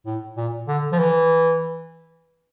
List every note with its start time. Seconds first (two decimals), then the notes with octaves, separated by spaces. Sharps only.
0.06 A2
0.37 A#2
0.68 D3
0.92 F3
0.99 E3